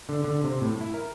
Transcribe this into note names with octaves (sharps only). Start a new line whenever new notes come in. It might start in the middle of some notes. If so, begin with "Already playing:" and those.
D3
D3
C3
A2
E4
A#4